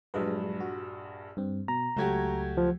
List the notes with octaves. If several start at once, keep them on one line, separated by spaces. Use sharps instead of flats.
A#1 G2 F#3 G#3 B4
F#4
G2 C4
B2 A#5
C#2 F#3 A3 F#4 G4 G#6
F3